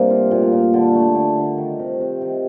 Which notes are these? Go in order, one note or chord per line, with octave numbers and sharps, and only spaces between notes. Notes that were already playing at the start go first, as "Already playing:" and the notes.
Already playing: G2 C3 A#3 D4
F4
A#2
A#2
D3
A3
D3
D3
D#3
C3
C3
D#3